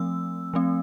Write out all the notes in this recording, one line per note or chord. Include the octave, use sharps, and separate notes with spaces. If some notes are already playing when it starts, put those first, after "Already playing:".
Already playing: F3 A3 C4 E6
F3 A3 C4